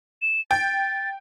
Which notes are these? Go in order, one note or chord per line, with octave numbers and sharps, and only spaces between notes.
E7
G5 A6